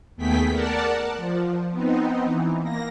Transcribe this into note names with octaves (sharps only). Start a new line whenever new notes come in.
D#2 A3 B3 G#4 G5 B6
A#4 D5 F#5 A5
F3
B3 C4 D#4
E3
A#3 A#6